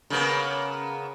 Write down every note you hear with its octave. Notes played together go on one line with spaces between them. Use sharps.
C#3 A#3 B3